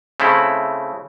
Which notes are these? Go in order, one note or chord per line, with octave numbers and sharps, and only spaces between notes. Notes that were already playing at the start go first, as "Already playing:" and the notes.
C#3 A3 C4 E4